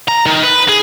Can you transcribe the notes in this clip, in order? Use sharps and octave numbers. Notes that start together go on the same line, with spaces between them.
A#5
D#3
B4
G#4